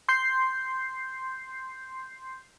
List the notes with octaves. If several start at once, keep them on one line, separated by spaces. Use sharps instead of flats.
C6 G6 C7